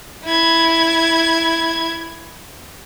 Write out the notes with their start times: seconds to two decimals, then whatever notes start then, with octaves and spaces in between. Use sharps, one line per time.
0.24 E4 G#6